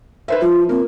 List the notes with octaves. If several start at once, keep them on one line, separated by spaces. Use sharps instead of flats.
B4 C5 E5
F3 F4
A#3 C4